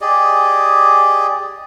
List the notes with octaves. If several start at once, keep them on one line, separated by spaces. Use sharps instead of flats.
G4 G#4 D5 D#5